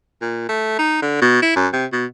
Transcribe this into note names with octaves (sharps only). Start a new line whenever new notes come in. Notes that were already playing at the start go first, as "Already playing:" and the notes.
A#2
A3
D#4
D3
B2
E4
F#2
C3
B2